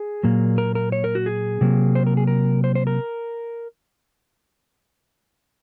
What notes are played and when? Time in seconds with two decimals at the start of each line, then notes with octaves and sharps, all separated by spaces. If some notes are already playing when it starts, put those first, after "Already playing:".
Already playing: G#4
0.23 A#2 F#3 A#3
0.58 A#4
0.75 A#4
0.92 C#5
1.04 A#4
1.15 F#4
1.26 G#4
1.61 C3 F#3 A#3
1.95 C5
2.07 A#4
2.17 G#4
2.27 A#4
2.64 C5
2.75 C5
2.87 A#4